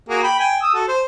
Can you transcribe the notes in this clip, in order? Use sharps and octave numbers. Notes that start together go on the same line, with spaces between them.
A#3 F#4 G#4
G5 B5
G5 G#5
D#6 E6
F#4 A4
C5